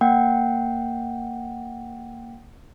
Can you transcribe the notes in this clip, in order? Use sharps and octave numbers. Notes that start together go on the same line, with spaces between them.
A#3 F#5 G5